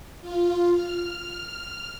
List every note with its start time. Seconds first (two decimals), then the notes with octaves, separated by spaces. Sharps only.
0.21 F4
0.70 F6